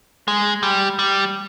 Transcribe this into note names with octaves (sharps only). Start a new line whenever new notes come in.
G#3
G3
G3